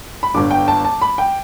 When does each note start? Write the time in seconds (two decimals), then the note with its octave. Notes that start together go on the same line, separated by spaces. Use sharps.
0.23 B5
0.34 G1 G2 D3 D6
0.51 G5
0.68 A5
0.85 A5
1.02 B5
1.18 G5